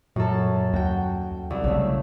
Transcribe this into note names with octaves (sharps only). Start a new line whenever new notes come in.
F#2 A#2 C#4 A4
D#2 F#4 G5
C2
B1 C#3 A3